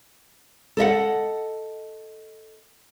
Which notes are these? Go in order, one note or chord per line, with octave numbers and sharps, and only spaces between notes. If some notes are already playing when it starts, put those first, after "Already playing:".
A4 D#5 E5 F#5